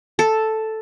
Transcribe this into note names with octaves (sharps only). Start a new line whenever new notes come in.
A4